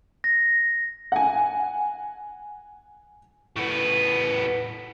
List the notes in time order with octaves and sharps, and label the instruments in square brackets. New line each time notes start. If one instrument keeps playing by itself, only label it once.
[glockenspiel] A#6
[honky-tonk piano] F#5 G#5
[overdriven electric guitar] A2 B3